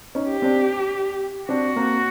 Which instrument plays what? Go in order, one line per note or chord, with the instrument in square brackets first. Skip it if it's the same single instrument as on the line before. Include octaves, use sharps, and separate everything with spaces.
[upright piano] C#4 D#4
[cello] G4
[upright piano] C4 D4
[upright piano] C4 D4 [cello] F#4
[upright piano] A#3 C4